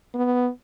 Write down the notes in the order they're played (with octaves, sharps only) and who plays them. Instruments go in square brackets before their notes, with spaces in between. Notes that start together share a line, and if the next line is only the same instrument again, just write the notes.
[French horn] B3